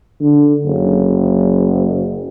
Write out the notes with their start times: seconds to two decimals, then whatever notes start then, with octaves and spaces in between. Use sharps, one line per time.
0.20 D3
0.65 F#1